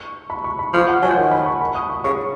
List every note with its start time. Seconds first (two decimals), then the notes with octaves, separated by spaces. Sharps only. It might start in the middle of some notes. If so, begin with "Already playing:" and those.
Already playing: C#6
0.30 B5
0.44 C#6
0.59 B5
0.73 F3 C#6
0.88 F#5
1.02 F#3 G#5
1.10 F3
1.17 D#3 F#5
1.31 B5
1.46 C#6
1.61 B5
1.75 D#6
1.90 C#6
2.04 C#3 C#6